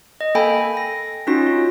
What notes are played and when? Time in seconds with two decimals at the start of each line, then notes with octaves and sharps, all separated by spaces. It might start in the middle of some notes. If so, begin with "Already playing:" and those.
0.21 D#5
0.35 A#3 A4 G5 G#5 B5
0.77 A#6
1.27 C#4 D#4 F4 F#4 A#6
1.47 F4